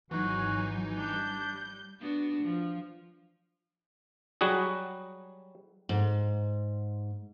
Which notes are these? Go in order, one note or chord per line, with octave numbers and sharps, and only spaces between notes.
G#1 E3 F#3 D#4 F#4 G#5
G3 D4 G6
B3 D4 F#4
F3
F#3 G3 F#4 G#4
G#2